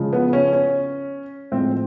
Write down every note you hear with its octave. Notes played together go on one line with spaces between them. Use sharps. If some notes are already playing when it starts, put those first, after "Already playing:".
Already playing: C#3 F3 G#3
B3
C#4
C#4
A2 F3 G#3 C4